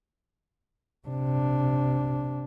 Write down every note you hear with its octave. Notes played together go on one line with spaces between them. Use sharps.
C3 D4